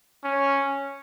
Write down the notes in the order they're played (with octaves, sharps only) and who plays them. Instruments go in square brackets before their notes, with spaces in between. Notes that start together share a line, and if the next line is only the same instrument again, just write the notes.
[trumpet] C#4